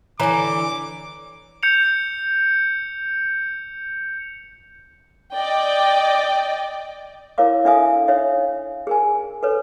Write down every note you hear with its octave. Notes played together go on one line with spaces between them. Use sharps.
D3 E3 C#5 G#5 A#5 D6
G6 C#7 F7
D5 D#5 G5
E4 A#4 C#5 F5 D6
D4 A4 E5 F5 G#5 D#6
D#4 C#5 E5 F5
G#4 A#4 G#5
A4 B4 C#5